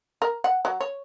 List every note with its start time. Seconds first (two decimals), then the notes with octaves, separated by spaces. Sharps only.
0.22 A#4
0.44 F#5
0.65 F#3
0.80 C#5